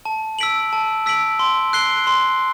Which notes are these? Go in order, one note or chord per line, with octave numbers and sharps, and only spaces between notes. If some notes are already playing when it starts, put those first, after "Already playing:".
A5
E6 B6 D7 F#7
A5
E6 B6 D7 F#7
C6
F#6 C7 G7
C6